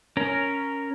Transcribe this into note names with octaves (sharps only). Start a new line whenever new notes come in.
C#4 A#4